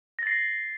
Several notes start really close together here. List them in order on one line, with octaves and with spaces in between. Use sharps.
A#6 A6 C7